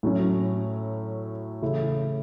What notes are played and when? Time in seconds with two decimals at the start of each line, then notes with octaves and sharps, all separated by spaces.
0.03 A2 F#3 C#4
1.62 C#3 E3 A3 E4